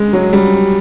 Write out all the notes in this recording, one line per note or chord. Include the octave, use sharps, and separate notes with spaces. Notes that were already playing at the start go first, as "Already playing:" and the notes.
Already playing: G#3
F#3
G3